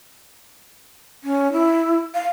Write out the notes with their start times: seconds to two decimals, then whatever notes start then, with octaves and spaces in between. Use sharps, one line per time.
1.24 C#4
1.52 E4
2.14 F5